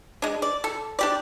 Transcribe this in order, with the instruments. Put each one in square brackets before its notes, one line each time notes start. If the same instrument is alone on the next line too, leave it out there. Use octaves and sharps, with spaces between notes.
[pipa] G#3 D4
D5
A4
D4 G4 D5